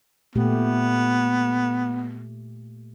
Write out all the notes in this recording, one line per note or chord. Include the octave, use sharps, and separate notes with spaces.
A#2 A3 B3 G4